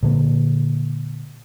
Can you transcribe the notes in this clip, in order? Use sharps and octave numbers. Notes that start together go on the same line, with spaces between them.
A#2 D3 A#3